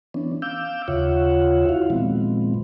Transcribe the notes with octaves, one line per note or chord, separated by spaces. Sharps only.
E3 B3 C#4 D4
F5 D6 E6 G6
D#2 C#3 F4 C#5 E5 F#5
E4 F#4 F5
A#2 D#3 F3 G#3 B3 C4